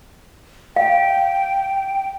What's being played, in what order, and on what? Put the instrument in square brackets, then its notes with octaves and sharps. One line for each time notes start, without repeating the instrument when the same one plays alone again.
[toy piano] F5 [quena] G5